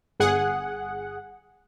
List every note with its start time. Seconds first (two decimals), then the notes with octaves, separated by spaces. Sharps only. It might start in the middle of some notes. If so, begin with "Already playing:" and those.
0.20 G1 G#4 F#5